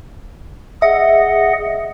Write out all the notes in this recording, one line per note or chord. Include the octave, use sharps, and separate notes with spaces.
G#4 D#5 E5 F#5